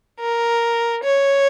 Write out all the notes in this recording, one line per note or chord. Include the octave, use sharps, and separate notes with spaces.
A#4
C#5